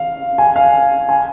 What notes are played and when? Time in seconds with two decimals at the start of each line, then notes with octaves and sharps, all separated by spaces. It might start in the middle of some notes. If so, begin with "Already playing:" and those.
Already playing: F5
0.38 G#5
0.56 F5
1.09 G#5